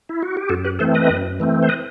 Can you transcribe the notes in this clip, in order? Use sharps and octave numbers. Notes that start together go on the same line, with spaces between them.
E4
F#4
G4
F#2 F#4 A4
G4 B4
E3 A3 C4 A4 C5
B4 D#5
F#2
E3 A3 C4
C5
B4 D#5